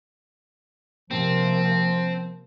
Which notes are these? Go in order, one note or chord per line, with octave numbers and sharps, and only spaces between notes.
C3 F3 A#3 C4